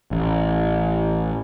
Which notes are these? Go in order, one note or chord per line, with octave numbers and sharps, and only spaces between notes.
A1